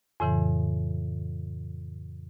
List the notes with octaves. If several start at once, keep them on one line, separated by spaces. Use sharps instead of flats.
F2 A2 C#3 E3